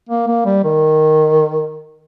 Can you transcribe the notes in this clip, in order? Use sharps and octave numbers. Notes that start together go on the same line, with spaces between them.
A#3
A#3
G3
D#3